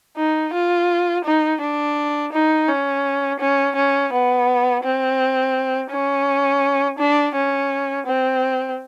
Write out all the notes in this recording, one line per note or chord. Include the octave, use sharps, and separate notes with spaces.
D#4
F4
D#4
D4
D#4
C#4
C#4
C#4
B3
C4
C#4
D4
C#4
C4